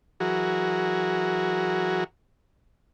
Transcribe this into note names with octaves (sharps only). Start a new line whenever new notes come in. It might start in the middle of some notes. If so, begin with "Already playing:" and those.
E3 F#3 F#4 G#4 A#4